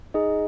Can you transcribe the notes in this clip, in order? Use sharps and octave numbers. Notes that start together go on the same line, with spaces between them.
D#4 G#4 D#5